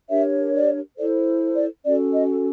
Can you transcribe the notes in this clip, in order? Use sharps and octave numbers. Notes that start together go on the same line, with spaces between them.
D4 G4 A#4 C#5 E5
D5
E4 A4 C5 D5
D5
C#4 F#4 A4 D5
D#5